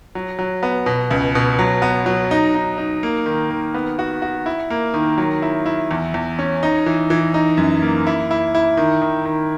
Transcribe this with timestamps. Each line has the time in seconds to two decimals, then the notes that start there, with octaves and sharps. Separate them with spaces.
0.15 F#3
0.39 F#3
0.63 B3
0.86 B2
1.10 C#2
1.35 B2
1.59 F#3
1.82 B3
2.06 F#3
2.31 D#4
2.55 D#4
2.78 D#4
3.03 A#3
3.26 D#3
3.51 D#3
3.74 B3
3.99 F#4
4.22 F#4
4.46 E4
4.70 A#3
4.94 D#3
5.18 F#3
5.42 E4
5.66 E4
5.91 E2
6.14 E2
6.39 C#4
6.63 D#4
6.86 E3
7.10 E3
7.34 D#4
7.57 F#2
7.82 A#3
8.07 E4
8.31 E4
8.55 E4
8.77 D#3
9.02 D#3
9.25 D#3